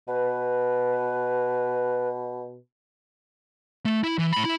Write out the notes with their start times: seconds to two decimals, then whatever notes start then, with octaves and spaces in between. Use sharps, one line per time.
0.08 B2 B4
3.86 A3
4.04 E4
4.19 E3
4.33 A2 B5
4.45 E4 B5